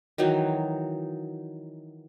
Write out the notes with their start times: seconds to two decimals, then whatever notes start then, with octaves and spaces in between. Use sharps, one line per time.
0.18 D#3 E3 F#3 D#4